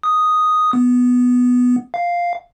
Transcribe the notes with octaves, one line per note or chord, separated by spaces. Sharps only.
D#6
B3
F5